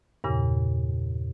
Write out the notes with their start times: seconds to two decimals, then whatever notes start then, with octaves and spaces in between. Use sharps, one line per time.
0.24 E2 G2 A#2 C#3